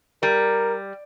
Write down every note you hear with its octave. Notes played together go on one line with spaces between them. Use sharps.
G3 A#4